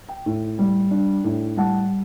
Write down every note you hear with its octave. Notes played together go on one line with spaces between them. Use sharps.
G5
A2
G3
D4
A2
G3 F#5 A5